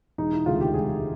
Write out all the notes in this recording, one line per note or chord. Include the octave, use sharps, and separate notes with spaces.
E1 D#4
E4
D2 C3 D#3 G#3 F4
G4
E1 G#4